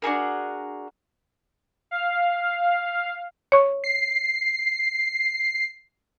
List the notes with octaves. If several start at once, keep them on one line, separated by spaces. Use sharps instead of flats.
D4 F#4 G#4 A#4
F5
C#5 C#6
C7